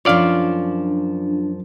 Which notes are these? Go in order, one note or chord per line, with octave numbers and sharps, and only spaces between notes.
F#2 F3 D4 F4 C#5 D5 F5